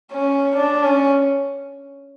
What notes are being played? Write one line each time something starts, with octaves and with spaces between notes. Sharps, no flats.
C#4
D4
C#4